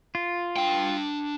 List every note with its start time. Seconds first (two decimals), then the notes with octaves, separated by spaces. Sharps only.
0.15 F4
0.56 D4 G5